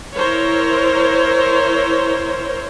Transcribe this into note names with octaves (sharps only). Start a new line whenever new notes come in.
E4 A#4 C5 C#5